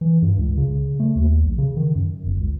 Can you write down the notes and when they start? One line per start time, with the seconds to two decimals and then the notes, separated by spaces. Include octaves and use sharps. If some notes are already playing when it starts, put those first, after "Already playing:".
0.01 E3
0.22 G2
0.38 C#2
0.57 C#3
1.00 A3
1.16 D#2
1.44 A#1
1.58 C#3
1.77 D#3
1.95 F#2
2.26 G1
2.40 C#2